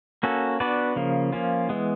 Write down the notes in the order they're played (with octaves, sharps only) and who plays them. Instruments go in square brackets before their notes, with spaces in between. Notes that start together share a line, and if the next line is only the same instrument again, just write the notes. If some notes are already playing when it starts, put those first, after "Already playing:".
[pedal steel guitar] A#3 C#4 F#4 A4
B3 D4 F#4 B4 D5
C#3 F3 A#3
F3 A#3 C#4 F4
E3 G#3 B3